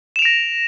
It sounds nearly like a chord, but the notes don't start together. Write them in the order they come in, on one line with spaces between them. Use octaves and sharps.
E7 F7 D7 A#6